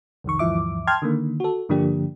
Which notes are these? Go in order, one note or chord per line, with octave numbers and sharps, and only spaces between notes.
C2 F2 D#3 C#6
D2 G2 E3 F3 E5 D6
G5 A5 C6 F6 G#6
D3 D#3 A#3
F#4 A4
G2 D3 F3 A#3 D4 G4